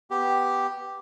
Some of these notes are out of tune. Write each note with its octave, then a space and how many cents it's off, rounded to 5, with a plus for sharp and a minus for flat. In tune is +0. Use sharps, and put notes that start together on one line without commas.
B3 +0 G4 +0